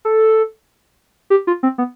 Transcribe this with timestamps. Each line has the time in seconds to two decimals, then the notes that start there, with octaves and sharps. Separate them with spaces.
0.05 A4
1.30 G4
1.47 F4
1.63 C4
1.78 B3